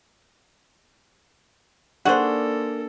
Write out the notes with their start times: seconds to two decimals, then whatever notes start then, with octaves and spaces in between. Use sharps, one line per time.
2.05 A#3 D4 F#4 G#4 A4 C5